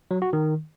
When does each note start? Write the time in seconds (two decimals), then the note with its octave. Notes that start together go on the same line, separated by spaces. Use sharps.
0.11 F#3
0.22 F#4
0.33 D#3